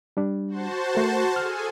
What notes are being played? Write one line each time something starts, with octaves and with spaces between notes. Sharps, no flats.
G3 D4
F#4 C5 A5
A3 A#4
G#4 A4 G#5 F6